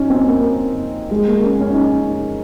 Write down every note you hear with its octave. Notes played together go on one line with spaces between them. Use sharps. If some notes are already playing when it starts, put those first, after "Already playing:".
Already playing: C#4 D#4
C4
A#3
G#3
A#3
C#4
C#4
D#4